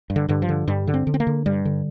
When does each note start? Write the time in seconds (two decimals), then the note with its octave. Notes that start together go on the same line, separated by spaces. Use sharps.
0.10 G2
0.16 D3
0.29 G2 D3
0.42 F3
0.49 D3
0.68 G2 G3
0.87 D3
0.94 C4
1.07 D3
1.14 C4
1.20 A#3
1.27 D3
1.46 G2 G3
1.65 D3